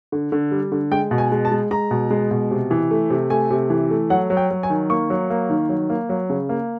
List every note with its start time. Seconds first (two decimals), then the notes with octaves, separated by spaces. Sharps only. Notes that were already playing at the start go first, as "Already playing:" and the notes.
0.12 D3
0.32 D3
0.51 G3
0.72 D3
0.91 G#3 G5
1.11 B2
1.18 G#5
1.32 G#3
1.45 A5
1.52 G#3
1.71 G#3 A#5
1.91 B2
2.11 G#3
2.31 B2
2.51 C3
2.71 E3
2.91 A3
3.10 C3
3.30 A3 G#5
3.50 C3
3.70 E3
3.91 A3
4.10 F#3 F#5
4.30 F#3
4.37 G5
4.51 F#3
4.63 G#5
4.70 D#3
4.90 A#3 C#6
5.10 F#3
5.30 A#3
5.50 D#3
5.69 F#3
5.90 A#3
6.09 F#3
6.30 C#3
6.49 A#3